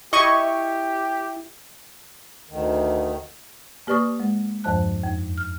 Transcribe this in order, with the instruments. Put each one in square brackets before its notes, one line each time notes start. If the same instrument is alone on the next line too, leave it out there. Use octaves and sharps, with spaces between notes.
[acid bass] E4 [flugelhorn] G4 [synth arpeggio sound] D#5 C#6 G#6
[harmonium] D2 D#3
[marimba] A#3 G4 B4 D5 C#6 D#6
G#3
E2 G2 F3 C5 A5 F#6
F2
F6